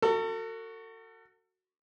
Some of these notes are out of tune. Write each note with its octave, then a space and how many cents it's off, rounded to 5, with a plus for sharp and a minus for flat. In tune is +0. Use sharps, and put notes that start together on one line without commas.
F#4 +0 A4 +40